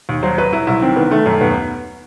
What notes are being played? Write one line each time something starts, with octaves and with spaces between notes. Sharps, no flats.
D#2
F#3 C5
F#3 B4
F#3 E4
C2 E4
D#3 C4
D#3 B3
D#3 A3
F#2
D#2 B3